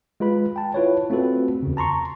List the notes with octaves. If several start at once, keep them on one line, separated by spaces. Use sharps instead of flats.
G#3 F4 B4 B5
G5 A5
E4 F4 B4 C#5
A3 C4 F4 F#4 A4 B4
E2 C#3
A5 A#5 C6 C#6